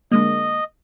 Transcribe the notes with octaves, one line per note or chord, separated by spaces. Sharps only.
D3 G#3 A#3 D#5